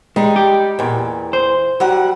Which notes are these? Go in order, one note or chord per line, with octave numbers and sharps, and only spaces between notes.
G3 G#3 D#4
G4
E2 A#2
C5
F#3 G3 F#5